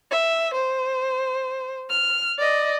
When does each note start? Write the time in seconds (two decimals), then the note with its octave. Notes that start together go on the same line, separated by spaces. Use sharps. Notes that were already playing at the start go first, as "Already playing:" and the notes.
0.11 E5
0.54 C5
1.90 F6
2.38 D5 D#5